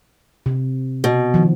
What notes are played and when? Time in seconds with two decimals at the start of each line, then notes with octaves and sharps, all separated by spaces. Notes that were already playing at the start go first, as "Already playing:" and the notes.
0.46 C3
1.04 B2
1.34 D#3 F3